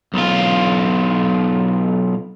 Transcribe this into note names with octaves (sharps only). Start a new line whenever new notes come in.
B1 F4